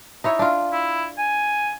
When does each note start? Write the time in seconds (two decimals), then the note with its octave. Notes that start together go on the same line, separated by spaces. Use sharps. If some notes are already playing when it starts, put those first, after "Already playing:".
0.24 D#4 E4 C#5
0.39 D4 F4
0.72 E4
1.18 G#5